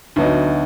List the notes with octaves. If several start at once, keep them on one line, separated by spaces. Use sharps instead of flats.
D2 D3 F#3 B3 D#4